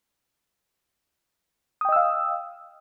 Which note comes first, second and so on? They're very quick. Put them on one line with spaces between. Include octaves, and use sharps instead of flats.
D#6 G5 D#5 E6 F5